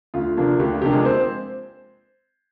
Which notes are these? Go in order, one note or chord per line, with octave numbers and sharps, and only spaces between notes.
D2 F4
C3 F3 A#3 D4
D2 G4
F4
C3 F3 A#3 D4 G4
G#3 G#4
C4 C5